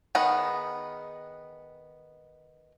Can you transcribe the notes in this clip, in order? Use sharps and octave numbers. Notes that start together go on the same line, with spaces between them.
D#3 B3 G#4 A#4 F#5